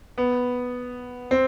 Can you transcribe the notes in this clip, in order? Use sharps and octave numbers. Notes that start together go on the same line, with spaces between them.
B3
C4